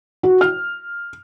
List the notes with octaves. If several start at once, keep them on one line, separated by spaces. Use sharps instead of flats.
F#4
F6